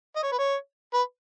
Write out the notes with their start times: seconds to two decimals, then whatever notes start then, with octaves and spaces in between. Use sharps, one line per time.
0.16 D#5
0.23 C#5
0.32 B4
0.38 C#5
0.94 B4